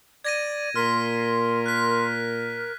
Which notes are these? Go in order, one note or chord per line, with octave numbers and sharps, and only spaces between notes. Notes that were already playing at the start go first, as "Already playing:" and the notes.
D5 G#6 A#6 D#7
A#2 A#4 C6 F6 B6
F#6 B6